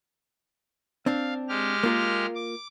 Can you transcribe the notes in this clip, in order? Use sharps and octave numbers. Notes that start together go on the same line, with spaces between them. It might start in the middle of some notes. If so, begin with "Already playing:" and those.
C4 D4 F5
G#3 G4 F6
A#3 F4 A#4
D6